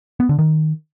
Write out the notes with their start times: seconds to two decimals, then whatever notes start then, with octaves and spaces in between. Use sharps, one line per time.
0.20 B3
0.29 D3
0.39 D#3